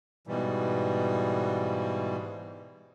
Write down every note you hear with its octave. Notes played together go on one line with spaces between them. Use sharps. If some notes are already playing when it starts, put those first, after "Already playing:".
G#2 B2 E3 G3